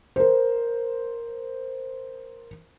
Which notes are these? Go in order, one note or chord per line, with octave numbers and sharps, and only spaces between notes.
A#4 C5